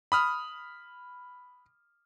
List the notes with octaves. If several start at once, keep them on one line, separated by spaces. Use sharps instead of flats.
B5 D#6 F6